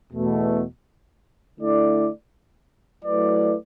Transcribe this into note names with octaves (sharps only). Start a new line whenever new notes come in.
E2 B2 A3
D3 A3 E4 D5
F#3 A3 E4 B4 D5